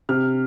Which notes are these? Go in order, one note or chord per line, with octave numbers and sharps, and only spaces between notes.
C3 F6